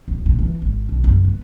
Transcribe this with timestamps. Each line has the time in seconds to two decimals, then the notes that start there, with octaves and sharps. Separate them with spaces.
0.08 D1
0.26 A#2
0.39 E3
0.62 G#1
0.89 B1
1.04 F#1
1.24 B3